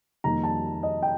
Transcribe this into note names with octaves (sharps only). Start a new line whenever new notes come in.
F2 D#3 G3 A#3 A#5
A5
D#5
G5